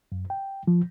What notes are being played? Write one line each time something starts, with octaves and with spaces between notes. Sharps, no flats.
F#2
G5
F3